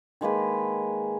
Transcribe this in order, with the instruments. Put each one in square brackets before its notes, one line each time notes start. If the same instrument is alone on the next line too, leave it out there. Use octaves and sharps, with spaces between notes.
[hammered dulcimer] D#3 G#3 A#3 B4